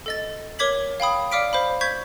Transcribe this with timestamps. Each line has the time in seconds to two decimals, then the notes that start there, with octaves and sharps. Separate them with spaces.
0.06 A4 D#5 A6
0.59 A#4 C#5 D6 G#6 B6 F#7
1.00 F5 G5 B5 D#6
1.31 D5 F5 D6 F6 B6 D7
1.53 C5 F5 B5
1.81 C#6 G6 G#6 B6